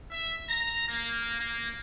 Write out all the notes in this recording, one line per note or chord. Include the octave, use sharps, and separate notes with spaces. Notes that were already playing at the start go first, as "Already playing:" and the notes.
E5
A#5
A#3
A#3